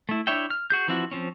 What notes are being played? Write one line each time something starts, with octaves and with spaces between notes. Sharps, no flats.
A3 E4
D4 E4 C#5 E5 G5
F6
F#4 G#4 G6
E3 F3 C4 E4 F#4
F3 C4 C#4